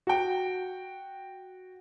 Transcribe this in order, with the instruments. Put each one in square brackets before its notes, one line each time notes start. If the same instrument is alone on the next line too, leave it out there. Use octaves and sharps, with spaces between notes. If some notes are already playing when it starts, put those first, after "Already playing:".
[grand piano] F#4 G5